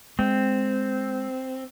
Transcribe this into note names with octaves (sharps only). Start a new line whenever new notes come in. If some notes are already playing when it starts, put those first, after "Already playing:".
G#3 C4